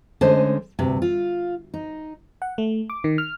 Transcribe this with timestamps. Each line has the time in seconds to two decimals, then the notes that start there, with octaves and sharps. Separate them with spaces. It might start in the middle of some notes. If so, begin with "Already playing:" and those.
0.21 D3 G#3 A3 C#4 C5 D#5
0.79 D2 G2 C3
1.02 F4
1.74 D#4
2.42 F#5
2.58 A3
2.90 D6
3.04 D#3
3.18 F6